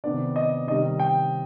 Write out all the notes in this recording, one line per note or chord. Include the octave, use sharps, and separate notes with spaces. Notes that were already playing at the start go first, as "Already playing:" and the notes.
C3 D#3 B3 D4 D5
D#5
C3 D#3 G3 D#5
G5